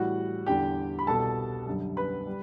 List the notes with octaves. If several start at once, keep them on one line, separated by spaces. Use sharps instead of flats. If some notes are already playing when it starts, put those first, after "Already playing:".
Already playing: A2 E3 G3 F#4 F#5
E2 D3 G3 G4 G5
B5
C2 B2 G3 A4 A5
F#2 D3 G3
B4 B5
G3